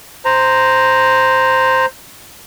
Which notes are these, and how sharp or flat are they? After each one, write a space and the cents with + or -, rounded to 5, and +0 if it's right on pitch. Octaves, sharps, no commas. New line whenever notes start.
C5 +0 A#5 -5